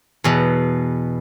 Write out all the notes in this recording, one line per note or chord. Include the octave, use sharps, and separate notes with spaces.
E2 B2